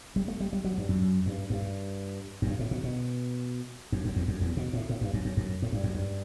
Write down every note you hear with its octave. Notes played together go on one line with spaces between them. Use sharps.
G3
A3
G3
G3
F#3
G2
F#2
F#2
G2
G2
F#2
G2
A2
B2
B2
F#2
F#2
E2
F#2
E2
B2
A2
A2
G2
F#2
F#2
F#2
A2
G2
F#2
G2